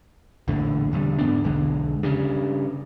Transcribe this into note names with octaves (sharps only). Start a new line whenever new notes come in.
A#1 E2 A2 D3
E1 E2 D3 G3
G#2 B3 D4
B1 E2 D3 G#3
G2 C#3